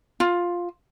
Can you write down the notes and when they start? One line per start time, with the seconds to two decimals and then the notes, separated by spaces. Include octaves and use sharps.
0.20 F4